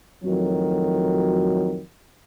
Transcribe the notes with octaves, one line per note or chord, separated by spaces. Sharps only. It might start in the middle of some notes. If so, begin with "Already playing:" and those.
F2 A2 D#3 F#3